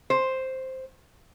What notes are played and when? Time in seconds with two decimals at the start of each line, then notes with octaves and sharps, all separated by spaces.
0.10 C5